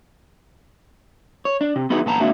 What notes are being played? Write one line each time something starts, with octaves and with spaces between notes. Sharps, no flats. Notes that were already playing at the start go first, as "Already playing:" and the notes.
C#5
D4
C3
B3 D#4 E4 F#4 G#4 B4
A#2 B3 A5 A#5
G#2 A#3 D4 F#4 E5